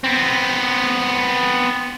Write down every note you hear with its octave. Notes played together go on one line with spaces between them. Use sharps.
B3 C4